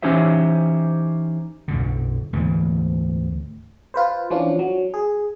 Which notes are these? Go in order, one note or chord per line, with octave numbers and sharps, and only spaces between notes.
E3 C#4 D#4 G4 C5 E5
B1 F#2 D3
D2 G#2 E3
F4 B4 C5
E3 F3 C#4 D4 F4
F#3
G#4